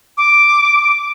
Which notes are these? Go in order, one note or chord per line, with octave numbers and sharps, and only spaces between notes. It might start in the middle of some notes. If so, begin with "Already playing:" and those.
D6